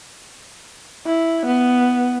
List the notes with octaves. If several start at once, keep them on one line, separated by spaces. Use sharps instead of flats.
E4
B3